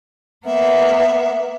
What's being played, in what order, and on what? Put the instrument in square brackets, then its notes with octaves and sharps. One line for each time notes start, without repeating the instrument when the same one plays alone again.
[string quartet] A#3 B3 [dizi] E5